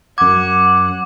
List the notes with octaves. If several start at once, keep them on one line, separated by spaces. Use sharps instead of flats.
F#2 F#5 D6 G#6